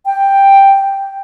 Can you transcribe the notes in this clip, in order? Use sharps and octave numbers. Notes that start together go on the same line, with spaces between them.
G5